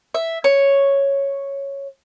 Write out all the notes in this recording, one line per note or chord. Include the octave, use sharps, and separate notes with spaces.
E5
C#5